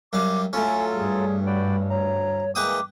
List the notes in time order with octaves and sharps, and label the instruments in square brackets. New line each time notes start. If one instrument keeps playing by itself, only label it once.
[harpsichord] F#2 G3 F5 [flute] D6
[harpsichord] A2 C#4 [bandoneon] F#3 F4 A4 [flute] G#5
[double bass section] G2 [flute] G#4
[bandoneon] F#4 D5 G5 [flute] B5
[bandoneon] D2 A#5 [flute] C#5
[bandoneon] E3 G#3 A#3 [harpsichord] B4 G5 D#6 [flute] D6